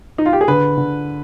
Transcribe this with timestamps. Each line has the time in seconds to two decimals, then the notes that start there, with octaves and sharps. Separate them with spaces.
0.18 D#4
0.26 F4
0.33 G4
0.41 G#4
0.48 D3 B4
0.78 D3